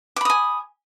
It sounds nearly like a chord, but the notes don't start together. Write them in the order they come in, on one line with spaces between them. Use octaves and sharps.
D6 B5 D#6 G#5